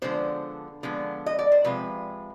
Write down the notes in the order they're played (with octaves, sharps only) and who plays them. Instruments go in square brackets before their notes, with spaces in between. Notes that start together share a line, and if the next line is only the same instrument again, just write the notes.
[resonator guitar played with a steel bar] D3 F3 G#3 B3 C5
D3 F3 G#3 B3
D#5
D5
C5
C3 F3 G#3 B4